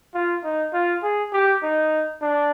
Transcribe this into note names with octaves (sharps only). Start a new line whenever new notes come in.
F4
D#4
F4
G#4
G4
D#4
D4